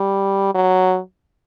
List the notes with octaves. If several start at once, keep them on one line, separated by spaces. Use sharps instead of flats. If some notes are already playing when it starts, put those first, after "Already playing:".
Already playing: G3
F#3